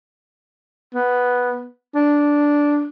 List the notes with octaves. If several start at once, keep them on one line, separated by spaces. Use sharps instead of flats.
B3
D4